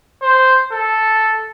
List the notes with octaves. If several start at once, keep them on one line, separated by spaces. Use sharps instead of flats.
C5
A4